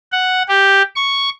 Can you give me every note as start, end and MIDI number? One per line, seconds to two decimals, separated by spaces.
0.12 0.43 78
0.48 0.82 67
0.96 1.29 85